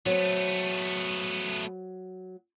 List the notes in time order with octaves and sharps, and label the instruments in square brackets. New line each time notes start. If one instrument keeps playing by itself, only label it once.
[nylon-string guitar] F#3 C4 [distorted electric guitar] A3 B3